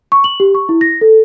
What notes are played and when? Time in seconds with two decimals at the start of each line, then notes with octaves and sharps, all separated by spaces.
0.12 C#6
0.24 F#7
0.40 G4
0.55 C#6
0.69 E4
0.81 A#6
1.01 A4